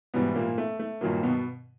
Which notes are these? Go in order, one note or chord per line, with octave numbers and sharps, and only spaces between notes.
G#2 B2 E3 G3 B3
A#2 A#3
A3
A3
G2 A#2 D#3 F#3 A#3
B2 B3